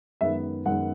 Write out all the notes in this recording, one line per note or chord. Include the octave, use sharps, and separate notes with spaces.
F#2 D#3 G#3 B3 E5
F#2 D#3 G#3 B3 F#5